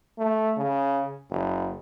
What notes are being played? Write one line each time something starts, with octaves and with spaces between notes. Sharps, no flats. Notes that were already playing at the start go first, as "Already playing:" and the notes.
A3
C#3
F#1